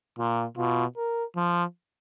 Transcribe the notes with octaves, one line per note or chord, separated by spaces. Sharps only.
A#2 F4
B2 F4
A#4
F3